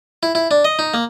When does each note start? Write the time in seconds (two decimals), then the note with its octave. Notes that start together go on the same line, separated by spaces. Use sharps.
0.23 E4
0.35 E4
0.51 D4
0.65 D#5
0.79 D#4
0.94 A#3